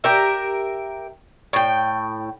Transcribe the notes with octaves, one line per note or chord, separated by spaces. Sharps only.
G4 A#4 E5
A2 G5